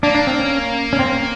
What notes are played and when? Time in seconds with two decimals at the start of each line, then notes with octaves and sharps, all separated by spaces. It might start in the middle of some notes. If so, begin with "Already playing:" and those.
0.03 A#3 D4
0.15 D4
0.27 C4
0.40 C#4
0.93 C#4
0.99 C4
1.15 C#4